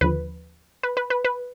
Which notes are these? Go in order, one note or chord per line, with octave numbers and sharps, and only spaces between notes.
D#2 D3 F3 B4
B4
B4
B4
B4